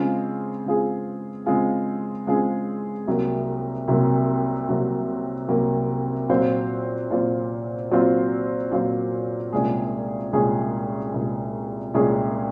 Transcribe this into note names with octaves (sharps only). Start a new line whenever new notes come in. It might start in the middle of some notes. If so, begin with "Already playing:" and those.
Already playing: C#3 G#3 C4 F4 G#4
C#3 G#3 C4 F4 G#4
C#3 G#3 C4 F4 G#4
C#3 G#3 C4 F4 G#4
C2 C3 F#3 A#3
C2 C3 F#3 A#3
C2 C3 F#3 A#3
C2 C3 F#3 A#3
A#2 F#3 C4 F4 C5
A#2 F#3 C4 F4 C5
A#2 F#3 C4 F4 C5
A#2 F#3 C4 F4 C5
C2 A#2 G#3 C#4 G#4
C2 A#2 G#3 C#4 G#4
C2 A#2 G#3 C#4 G#4
C2 A#2 G#3 C#4 G#4